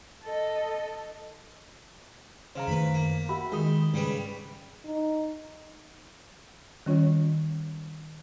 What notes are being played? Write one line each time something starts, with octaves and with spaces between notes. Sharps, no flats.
A4 D#5
C#3 C5 F5 A#5
F#2 D#3 A3 B4 B5
A#3
F#4 G4 E5 B5
D#3 G#3 G#4 D#6
G#2 C#3 G3 B4
D#4
D#3 G3 C#4 F4 C#5